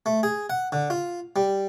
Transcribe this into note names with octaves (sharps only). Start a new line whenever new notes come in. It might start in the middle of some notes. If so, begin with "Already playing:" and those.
A3
G#4
F#5
D3
F4
G3